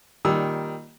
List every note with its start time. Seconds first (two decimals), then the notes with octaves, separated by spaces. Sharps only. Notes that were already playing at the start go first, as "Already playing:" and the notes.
0.25 A#2 D#3 G3 E6